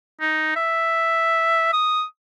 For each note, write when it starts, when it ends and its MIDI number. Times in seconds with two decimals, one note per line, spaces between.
0.21 0.51 63
0.56 1.69 76
1.73 2.03 87